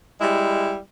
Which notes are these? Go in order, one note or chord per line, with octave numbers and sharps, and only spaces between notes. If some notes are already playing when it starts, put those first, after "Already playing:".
G3 G#3 E4